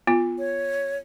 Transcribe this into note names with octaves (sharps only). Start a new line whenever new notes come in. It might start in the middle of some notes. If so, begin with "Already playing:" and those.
B3 F4
C#5